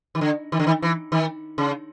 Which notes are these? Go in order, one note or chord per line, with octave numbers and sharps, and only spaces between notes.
D#3
D3
D#3
D3
D#3
E3
D#3
C#3